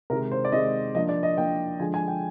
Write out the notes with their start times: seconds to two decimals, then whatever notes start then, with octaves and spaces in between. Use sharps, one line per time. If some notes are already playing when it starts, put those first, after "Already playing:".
0.10 C3 D#3 G#3 A#4
0.32 C5
0.45 D5
0.52 C3 D#3 G#3 D#5
0.95 F3 A#3 D4 D#5
1.09 D5
1.23 D#5
1.37 F3 A#3 D4 G5
1.80 D3 F3 G#3 G#5
1.94 G#5
2.08 G5